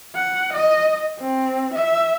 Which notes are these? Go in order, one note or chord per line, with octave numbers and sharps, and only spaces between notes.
F#5
D#5
C4
E5